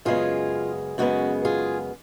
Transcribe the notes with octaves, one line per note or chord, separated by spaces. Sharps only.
F#2 C#3 G#3 B3 F4 G#4
F#2 C#3 G#3 B3 F#4
F4 G#4